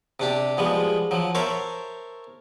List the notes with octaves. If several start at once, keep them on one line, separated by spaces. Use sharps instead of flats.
C3 D4 G4
B2 F3 G3 G#3
F3 F#3
A#4 C5 C#5 E5 A5